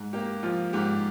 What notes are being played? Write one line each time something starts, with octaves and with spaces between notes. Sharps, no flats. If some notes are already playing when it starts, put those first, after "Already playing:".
Already playing: G#2
A#3 G4
F3 F4
G#2 G4